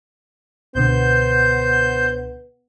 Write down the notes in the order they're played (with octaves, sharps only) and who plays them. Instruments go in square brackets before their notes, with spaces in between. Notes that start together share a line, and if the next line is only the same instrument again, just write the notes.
[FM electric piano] C#2 B2 D3 [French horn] B3 [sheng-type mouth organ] C5 G6